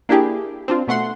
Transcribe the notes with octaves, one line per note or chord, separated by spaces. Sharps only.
A#3 D4 E4 G4 G#4
C4 D4 F4
B2 A3 F#5 C6